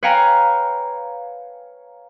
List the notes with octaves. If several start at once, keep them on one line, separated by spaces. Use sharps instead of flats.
B4 C#5 F5 G5 G#5 A#5